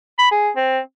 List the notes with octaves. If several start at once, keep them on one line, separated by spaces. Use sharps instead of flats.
B5
G#4
C4